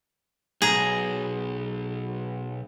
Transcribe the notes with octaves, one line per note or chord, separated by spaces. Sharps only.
B1 G#4 A#5